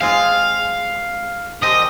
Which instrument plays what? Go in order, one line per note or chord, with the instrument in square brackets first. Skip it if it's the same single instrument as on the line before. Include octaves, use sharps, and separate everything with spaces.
[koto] G#3 C4 F4 G#4 [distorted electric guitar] F5
[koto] A#2 F3 C4 G4 [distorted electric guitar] D#5